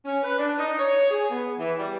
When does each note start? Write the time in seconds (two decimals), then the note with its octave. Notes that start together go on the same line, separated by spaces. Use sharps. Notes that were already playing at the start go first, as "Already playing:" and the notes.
0.05 C#4
0.23 B4
0.38 D4
0.58 D#4
0.79 C#5
1.11 G#4
1.30 B3
1.58 E3
1.78 G3